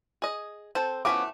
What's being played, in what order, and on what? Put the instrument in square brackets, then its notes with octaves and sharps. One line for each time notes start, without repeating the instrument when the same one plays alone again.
[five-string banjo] G#4 D#5
[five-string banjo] C4 [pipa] A4 C5
[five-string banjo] F3 B3 C#4 [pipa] A3 E4 F#4 [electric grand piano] D6